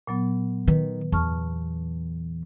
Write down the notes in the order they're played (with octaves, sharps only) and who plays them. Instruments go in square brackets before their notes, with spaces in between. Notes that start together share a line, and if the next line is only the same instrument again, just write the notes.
[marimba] A#2 F#3 B3
[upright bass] D#3 [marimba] B4
[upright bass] E2 [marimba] A5 C#6 F6